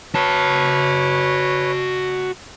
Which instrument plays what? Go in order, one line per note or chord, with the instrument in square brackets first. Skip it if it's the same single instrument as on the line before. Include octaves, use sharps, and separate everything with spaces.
[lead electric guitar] F#4 A5 [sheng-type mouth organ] B4 C#5